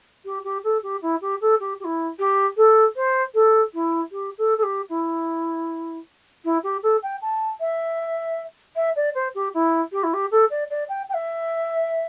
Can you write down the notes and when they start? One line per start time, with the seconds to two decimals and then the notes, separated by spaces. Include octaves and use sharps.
0.25 G4
0.44 G4
0.64 A4
0.82 G4
1.01 E4
1.21 G4
1.41 A4
1.60 G4
1.80 G4
1.84 E4
2.19 G4
2.57 A4
2.95 C5
3.34 A4
3.73 E4
4.11 G4
4.38 A4
4.57 A4
4.63 G4
4.89 E4
6.44 E4
6.63 G4
6.83 A4
7.02 G5
7.22 A5
7.60 E5
8.76 E5
8.96 D5
9.14 C5
9.35 G4
9.54 E4
9.92 G4
10.03 E4
10.13 G4
10.31 A4
10.50 D5
10.70 D5
10.88 G5
11.09 G5
11.13 E5